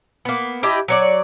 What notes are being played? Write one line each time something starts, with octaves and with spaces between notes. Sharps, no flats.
A#3 B3
D4 E4 G4 D#5
F#3 C#5 D5